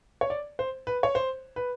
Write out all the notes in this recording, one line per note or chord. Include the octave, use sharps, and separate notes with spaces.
C#5
D5
C5
B4
C#5
C5
B4